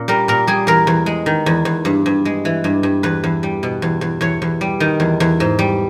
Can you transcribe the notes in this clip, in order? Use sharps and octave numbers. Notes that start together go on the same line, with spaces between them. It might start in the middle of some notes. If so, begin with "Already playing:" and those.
Already playing: A#2 C#4
G3 A#4
A#2 A#4
G3 G#4
E2 A#4
E2
G#3
D#3
E2
E2
G2
G2
G#3
E3
G2
G2
E2 B4
E2
G3
B2
E2
E2
E2 C#5
E2
G3
D#3
E2
E2
G#2
G3